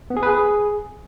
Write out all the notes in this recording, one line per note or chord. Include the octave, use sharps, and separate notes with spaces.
B3
G#4
B4
G#4